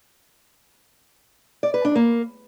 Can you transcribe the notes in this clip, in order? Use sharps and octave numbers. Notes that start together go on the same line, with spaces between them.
D5
B4
D4
A#3